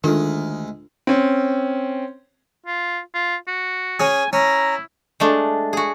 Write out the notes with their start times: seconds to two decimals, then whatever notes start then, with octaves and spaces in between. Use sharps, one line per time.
0.04 D2 D#3 G#3 D4 F4 A4
1.07 C4 C#4
2.66 F4
3.14 F4
3.47 F#4
4.00 C#4 G#4 G#5
4.33 C#4 E4 A#5
5.20 G#3 A3 D4
5.73 F#4 G#4